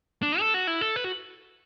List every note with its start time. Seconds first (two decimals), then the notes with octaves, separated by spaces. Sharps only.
0.23 D4
0.40 A4
0.54 F#4
0.67 E4
0.81 A4
0.96 B4
1.04 F#4